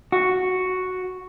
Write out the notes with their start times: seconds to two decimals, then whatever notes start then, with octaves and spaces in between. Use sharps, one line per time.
0.12 F#4